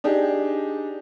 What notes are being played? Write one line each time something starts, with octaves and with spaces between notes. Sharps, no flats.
D4 D#4 G4 G#4